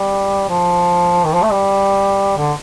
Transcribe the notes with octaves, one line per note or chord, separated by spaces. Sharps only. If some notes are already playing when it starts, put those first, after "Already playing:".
Already playing: G3
F3
D#3
F3
A3
G3
D3